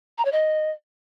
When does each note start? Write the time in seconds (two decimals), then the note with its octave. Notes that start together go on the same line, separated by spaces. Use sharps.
0.18 A#5
0.25 C#5
0.32 D#5